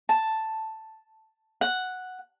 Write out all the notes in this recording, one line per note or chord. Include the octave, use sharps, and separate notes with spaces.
A5
F#5